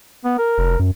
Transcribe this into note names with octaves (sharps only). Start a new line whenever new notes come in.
B3
A#4
F1
F#2